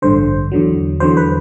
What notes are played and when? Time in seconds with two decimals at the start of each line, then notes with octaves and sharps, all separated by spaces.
0.02 A1 G2 D3 C5
0.52 E2 D3 F#3
1.00 E2 D3 F#3 C5
1.17 B4